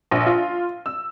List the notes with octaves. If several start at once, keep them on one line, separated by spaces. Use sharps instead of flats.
A#1
F4
E6